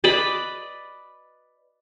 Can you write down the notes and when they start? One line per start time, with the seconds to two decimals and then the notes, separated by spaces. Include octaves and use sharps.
0.04 B4 D5 D#5 B5